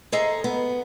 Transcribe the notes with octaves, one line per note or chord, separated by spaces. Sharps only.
G#4 A4 C5 D#5 A#5
B3